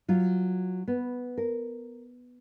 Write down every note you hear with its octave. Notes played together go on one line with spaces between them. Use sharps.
F#3 F4
B3
A#4